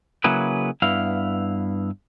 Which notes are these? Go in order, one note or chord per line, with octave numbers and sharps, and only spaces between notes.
C#3 F#3 A#3 E4 G#4 B4
G2 B3 E4 F5